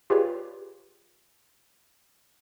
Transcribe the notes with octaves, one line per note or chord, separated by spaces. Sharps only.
F4 G4 G#4 B4 C#5 D5